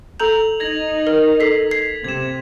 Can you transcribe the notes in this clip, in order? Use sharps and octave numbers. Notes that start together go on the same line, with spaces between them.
A4 A#5 G6 F7 F#7
D#4 G#6 A#6 F#7
A#4
A4 B6 C7
G#6 C7
C3 G#6 E7